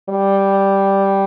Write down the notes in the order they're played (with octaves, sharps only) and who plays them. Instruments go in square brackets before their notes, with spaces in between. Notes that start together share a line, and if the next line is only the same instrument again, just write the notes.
[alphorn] G3